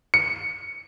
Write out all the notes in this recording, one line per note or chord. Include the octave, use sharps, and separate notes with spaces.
C#7